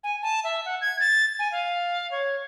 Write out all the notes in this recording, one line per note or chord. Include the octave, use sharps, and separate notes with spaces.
G#5
A5
E5
F#5
G#6
A6
G#5
F5
C#5